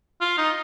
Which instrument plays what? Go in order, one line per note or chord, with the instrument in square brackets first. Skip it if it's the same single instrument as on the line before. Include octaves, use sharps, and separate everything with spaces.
[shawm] F4
D#4